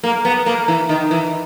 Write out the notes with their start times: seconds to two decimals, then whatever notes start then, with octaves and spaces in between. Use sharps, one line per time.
0.03 A#3
0.25 B3
0.46 A#3
0.68 E3
0.89 D#3
1.11 E3